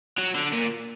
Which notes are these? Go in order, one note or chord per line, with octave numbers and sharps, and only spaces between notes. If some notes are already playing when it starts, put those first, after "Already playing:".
F#3
D3
A#2